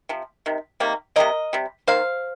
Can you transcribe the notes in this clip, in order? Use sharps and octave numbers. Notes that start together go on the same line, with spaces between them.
C3 F3
C3 D#3
C3 D#3 G3 A#3
C3 G3 A#3 A#4 D#5
C3 G3
D#3 A#3 C5 F5